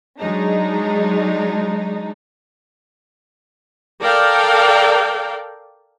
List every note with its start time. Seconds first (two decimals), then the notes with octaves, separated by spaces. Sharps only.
0.19 F#3 G#3 D4 D#4
4.01 A4 A#4 D5 F5 G5